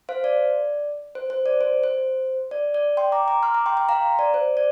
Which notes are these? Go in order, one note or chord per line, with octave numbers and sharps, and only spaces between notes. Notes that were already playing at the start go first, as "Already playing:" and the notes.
C5 F5
D5
C5
C5
D5
C5
C5
D5
D5
G5 C6
A#5 D6
A#5 D6
C6 F6
A#5 D6
G5 C6
G5 C6
F5 A#5
D5
C5
D5